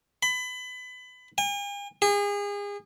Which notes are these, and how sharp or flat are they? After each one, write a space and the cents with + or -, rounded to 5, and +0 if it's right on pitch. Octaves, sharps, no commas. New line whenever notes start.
B5 +25
G#5 -45
G#4 -35